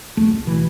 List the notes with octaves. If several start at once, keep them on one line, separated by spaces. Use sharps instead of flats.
C#2 A3
C#2
B2 E3